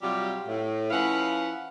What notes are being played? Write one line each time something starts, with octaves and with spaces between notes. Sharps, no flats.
C3 F#3 G3 F4 G4
A2
F3 C#4 E4 B4 F5 F#5